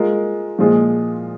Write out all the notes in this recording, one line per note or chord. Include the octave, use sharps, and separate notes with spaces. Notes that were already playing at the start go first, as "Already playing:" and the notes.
Already playing: G#3 F4 A#4
A#2 F3 G#3 F4 G#4